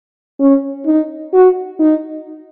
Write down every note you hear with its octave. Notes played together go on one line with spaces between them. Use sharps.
C#4
D#4
F#4
D#4